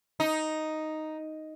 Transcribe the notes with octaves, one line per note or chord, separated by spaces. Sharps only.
D#4